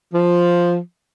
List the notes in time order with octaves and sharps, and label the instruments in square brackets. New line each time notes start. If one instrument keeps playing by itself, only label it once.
[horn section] F3